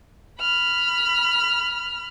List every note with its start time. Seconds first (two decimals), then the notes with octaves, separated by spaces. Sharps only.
0.40 B5 F6